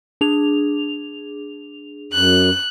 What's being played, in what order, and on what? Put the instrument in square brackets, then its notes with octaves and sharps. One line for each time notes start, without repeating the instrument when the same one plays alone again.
[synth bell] D4 G#4 F7
[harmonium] F#2 [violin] F#6